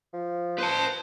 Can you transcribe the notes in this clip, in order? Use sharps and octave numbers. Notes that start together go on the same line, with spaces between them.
F3
B4 C5 A5